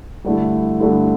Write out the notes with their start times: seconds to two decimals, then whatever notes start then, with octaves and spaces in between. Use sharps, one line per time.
0.25 G2 D3 A3 E4
0.80 G2 D3 A3 E4